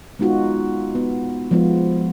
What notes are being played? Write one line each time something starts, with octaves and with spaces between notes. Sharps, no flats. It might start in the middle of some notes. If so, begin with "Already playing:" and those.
G#3 B3 D#4 F4 F#4
B3
F3 G#3 B3 F4